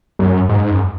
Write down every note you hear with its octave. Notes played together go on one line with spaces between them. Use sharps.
F#2
G#2
F#2